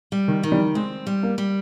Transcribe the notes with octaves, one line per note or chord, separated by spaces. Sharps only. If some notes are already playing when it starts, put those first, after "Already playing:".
G3
D#3
D#3
G3
G#3 C4
G3
A#3
G3